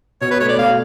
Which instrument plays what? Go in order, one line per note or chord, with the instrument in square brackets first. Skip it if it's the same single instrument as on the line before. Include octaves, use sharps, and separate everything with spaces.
[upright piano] B2 [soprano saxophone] C#5
[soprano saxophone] B4
[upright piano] A3 [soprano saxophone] C#5
[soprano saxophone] D5
[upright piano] B2 [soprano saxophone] F5